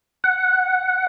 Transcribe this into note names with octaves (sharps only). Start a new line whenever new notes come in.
F#5